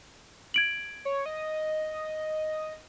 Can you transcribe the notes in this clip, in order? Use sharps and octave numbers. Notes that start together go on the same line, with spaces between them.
G#6 D7 F#7
C#5
D#5